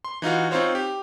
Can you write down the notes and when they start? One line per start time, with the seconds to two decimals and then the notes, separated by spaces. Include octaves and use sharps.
0.05 C6
0.22 E3 D#4 F4 F#4
0.51 C4 D#4 F4 C5 C#5
0.75 G4